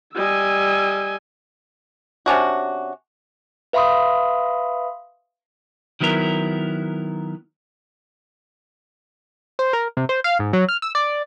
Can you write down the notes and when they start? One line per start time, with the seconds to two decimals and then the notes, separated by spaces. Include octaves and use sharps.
0.15 G3 D#5 G#5 E6
2.26 C3 C#4 D4 F#4
3.73 B4 E5 F5 B5 C6 D#6
6.00 D#3 F#3 B3 E4 A#4
9.59 C5
9.73 A#4
9.97 C3
10.09 C5
10.24 F5
10.39 G#2
10.53 F#3
10.69 F6
10.82 E6
10.95 D5